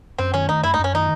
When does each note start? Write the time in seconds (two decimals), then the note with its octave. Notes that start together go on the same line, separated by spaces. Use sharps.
0.18 F#2 C4
0.34 D#3 C#4
0.48 A3 D#4
0.63 F#2 E4
0.74 D#4
0.79 F#2
0.84 C#4
0.94 D#3 D#4